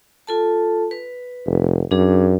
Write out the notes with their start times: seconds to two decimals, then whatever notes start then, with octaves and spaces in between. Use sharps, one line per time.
0.27 F4 A4 A5
0.91 B4
1.46 F1
1.91 F#2 D4 G#4